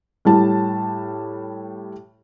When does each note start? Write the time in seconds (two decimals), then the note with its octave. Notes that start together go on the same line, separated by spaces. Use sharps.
0.25 A2 G3 A5